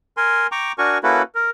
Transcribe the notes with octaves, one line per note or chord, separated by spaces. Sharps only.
A#4 G#5 C6
G5 A#5 C#6 D6
D4 F#4 A#4 G#5 C#6
A#3 C#4 E4 F#4 A4 B4
A#4